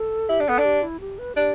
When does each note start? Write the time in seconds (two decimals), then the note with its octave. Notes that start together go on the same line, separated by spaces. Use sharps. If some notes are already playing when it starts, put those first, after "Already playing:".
Already playing: A4
0.29 E4 G4
0.40 D4
0.47 B3 A4
0.58 D4
0.65 G4
0.83 E4
1.00 G4
1.18 B4
1.36 D4 G4